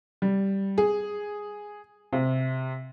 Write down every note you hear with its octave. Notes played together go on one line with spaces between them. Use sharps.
G3
G#4
C3